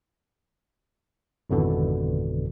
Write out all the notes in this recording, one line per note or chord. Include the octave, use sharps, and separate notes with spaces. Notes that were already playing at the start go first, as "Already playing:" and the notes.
G#1 F2 B2 D3 E3